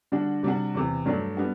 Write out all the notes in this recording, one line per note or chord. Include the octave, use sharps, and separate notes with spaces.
D3 G3 D4 F#4
C3 G3 D4 F#4
E2 C3 E3
G2 F#3 A3 D4
G3 B3 D4 F#4